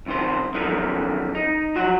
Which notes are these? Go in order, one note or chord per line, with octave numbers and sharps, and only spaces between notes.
C2 D#3 C5
F#2 D3 D#3 F3
D#4
F3 F#3 F#4